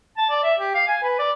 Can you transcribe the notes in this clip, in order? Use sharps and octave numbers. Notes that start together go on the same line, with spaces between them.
A5
D5
E5
G4
F5
G#5
B4
D5